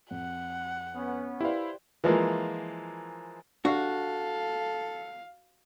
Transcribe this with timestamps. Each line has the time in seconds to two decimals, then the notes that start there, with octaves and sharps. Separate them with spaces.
0.11 F2 F#5
0.96 B3 C#4
1.41 E4 G4 B4 C5 D5 F5
2.04 E3 F3 G#3 A#3
3.65 D4 F#4 G4 A4 F5